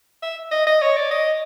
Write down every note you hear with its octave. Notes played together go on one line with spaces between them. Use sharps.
E5
D#5
D#5
C#5
D5
D#5